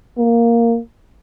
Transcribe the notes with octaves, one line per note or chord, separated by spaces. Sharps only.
A#3